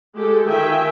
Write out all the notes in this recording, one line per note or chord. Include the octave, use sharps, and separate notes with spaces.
G#3 G4 A4
D#3 F4 E5 G5 G#5